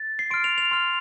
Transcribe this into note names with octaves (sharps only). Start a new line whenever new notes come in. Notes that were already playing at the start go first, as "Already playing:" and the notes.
Already playing: A6
C7
C6 F6 D7
F7
F7
C6 F6